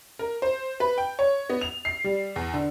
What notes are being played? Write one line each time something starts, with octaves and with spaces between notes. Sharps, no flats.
A#4
C5
B4
G5
C#5
B3
F7
C7
G3
E2
D3